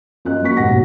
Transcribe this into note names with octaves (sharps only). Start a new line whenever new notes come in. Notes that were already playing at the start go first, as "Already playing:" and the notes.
F#2 F4 D#5 F#6
F#2 F#3 A#3 F#4 C#6 B6
E1 D#2 B3 F#4 F#5 A#6
B1